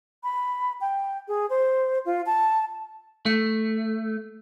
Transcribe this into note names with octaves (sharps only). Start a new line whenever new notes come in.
B5
G5
G#4
C5
F4
A5
A3